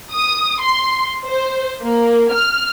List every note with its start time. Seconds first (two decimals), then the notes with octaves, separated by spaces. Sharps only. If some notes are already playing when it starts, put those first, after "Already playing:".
0.13 D#6
0.62 C6
1.27 C5
1.83 A#3
2.33 F6